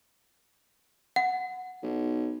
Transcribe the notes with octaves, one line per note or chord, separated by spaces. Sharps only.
F#5
B1